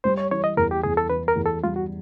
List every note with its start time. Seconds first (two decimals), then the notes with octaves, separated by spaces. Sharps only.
0.04 G3 C5
0.18 C#5
0.31 E3 C#5
0.44 D#5
0.57 E2 A#4
0.71 G4
0.83 E2 G#4
0.97 A4
1.10 E3 B4
1.28 A#4
1.36 E2
1.46 A4
1.64 G3 F4
1.76 F#4